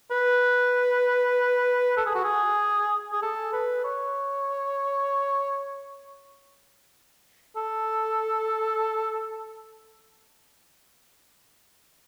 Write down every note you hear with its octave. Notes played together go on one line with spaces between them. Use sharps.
B4
A4
G#4
F#4
G#4
G#4
A4
B4
C#5
A4